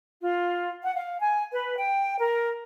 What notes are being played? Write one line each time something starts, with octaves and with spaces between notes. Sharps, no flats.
F4
F#5
F5
G#5
B4
G5
A#4